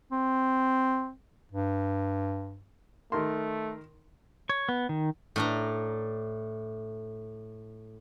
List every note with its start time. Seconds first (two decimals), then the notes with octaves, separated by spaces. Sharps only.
0.12 C4
1.52 G2
3.12 D#3 A3 A#4 C6
4.50 C#5
4.69 B3
4.89 D#3
5.36 A2 D4 A#5